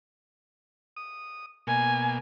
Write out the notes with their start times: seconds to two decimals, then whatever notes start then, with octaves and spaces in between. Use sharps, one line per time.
0.96 D#6
1.67 B2 A#3 G#5